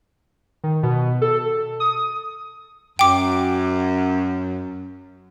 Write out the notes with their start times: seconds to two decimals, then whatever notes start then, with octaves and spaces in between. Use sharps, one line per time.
0.64 D#3
0.83 B2
1.22 A4
1.80 D#6
2.99 F#2 G5 D6